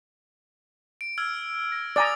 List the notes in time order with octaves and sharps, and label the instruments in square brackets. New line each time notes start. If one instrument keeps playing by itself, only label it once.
[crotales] D7
E6 F6 G#6
A#6
[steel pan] D5 G#5 A#5 [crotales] D#6 A6 D7